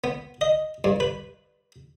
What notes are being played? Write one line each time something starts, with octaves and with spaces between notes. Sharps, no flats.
B3
D#5
G2
B4